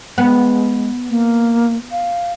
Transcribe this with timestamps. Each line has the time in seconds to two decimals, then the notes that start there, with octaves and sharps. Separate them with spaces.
0.18 G#3 B3
1.10 A#3
1.92 F5